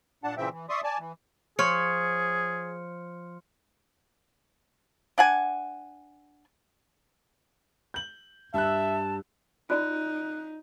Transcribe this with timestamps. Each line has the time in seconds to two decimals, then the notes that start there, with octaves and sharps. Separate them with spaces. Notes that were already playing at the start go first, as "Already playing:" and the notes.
0.24 A#2 D4 F#5 A5
0.37 A#2 C#3 E3 C4 E5 G5
0.52 E3
0.69 D5 E5 C6 C#6 D#6
0.84 D5 G#5 A5
0.99 E3
1.59 F3 G#4 C#5 C6 F6 C#7
5.18 D4 F#5 G#5
7.94 G6 F#7
8.54 G2 E5 A5 E6 F#6
9.70 D#4 F4 F#4 D5 F#6